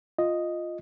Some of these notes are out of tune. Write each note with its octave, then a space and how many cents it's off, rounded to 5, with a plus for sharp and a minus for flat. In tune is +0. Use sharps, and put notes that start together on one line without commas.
F4 +0 D#5 +0